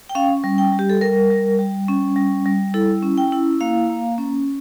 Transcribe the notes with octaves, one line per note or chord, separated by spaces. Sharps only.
G5
C#4 F5
G3
G5
G3
G4
A4
G3 A#4
G3
G3
C#4
G3
G3
E4 A4
C#4
G5
E4
A#3 F5
A#3
C#4